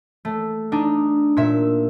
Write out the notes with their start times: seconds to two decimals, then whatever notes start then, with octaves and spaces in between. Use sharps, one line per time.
0.25 A3
0.72 D4 D#4
1.37 A#2 E5